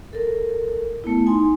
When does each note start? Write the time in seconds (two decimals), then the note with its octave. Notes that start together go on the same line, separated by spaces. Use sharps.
0.13 A4 A#4
1.04 A3 B3 E4
1.26 D#4 G#5 C6